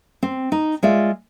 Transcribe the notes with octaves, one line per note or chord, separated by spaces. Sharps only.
C4
D#4
G#3 F4 D5 E5